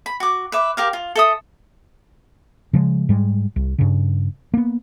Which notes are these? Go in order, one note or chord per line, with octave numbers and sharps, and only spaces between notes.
B5
F#4 D6
B4 E5 D6
G4 A#4 F5
F4
A4 E5 D#6
C#3 F3 G#3
G#2 G3 G#3
C2
G2 C#3
A#3 B3